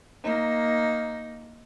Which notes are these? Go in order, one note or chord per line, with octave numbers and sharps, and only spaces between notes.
A#3 D#4